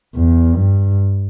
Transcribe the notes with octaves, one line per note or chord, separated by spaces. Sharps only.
E2
G2